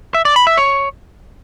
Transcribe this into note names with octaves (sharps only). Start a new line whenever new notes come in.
E5
D5
B5
E5
C#5